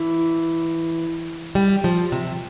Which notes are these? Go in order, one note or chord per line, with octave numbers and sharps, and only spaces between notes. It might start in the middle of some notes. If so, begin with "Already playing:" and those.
Already playing: E3
G3
F3
C3